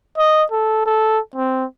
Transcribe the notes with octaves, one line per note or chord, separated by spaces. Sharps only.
D#5
A4
A4
C4